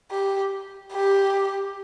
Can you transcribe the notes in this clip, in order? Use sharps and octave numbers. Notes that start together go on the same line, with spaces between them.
G4
G4